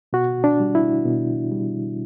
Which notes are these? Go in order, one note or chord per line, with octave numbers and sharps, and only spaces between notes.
B2 F#4
D4
G3
E4
B2
G3